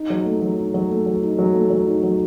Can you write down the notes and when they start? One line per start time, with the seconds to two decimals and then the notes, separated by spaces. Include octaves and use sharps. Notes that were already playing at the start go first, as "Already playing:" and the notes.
Already playing: D#4
0.10 F#3
0.25 A3
0.42 F#3
0.58 D#4
0.74 F#3
0.90 A3
1.06 F#3
1.23 D#4
1.39 F#3
1.54 A3
1.70 F#3
1.87 D#4
2.03 F#3